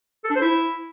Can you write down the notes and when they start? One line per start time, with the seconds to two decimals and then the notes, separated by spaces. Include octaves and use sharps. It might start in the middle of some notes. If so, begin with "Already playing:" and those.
0.24 A4
0.30 D4
0.36 C5
0.41 E4